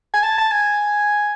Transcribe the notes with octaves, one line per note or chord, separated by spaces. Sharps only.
G#5
A5
A5
G#5